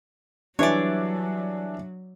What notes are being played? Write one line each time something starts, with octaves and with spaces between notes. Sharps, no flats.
E3 F#3 G3 D4 C#5 D5 E5 G#5